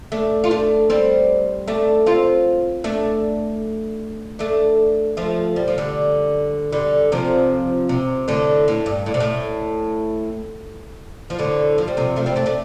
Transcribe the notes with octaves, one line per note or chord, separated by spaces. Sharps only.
A3 D4
F4
A3 D4
G3 C4
A3 D4
C4 F4
A3 D4
A3 D4
F3 A3
G3
F3
D3 G3
D3 G3
C3 F3
C3
A2 D3
A2
G2
A2
C3
A2
F3
A2 D3
F3
G3
C3 F3
F3 A3
G3 C4
A3 D4
A3 D4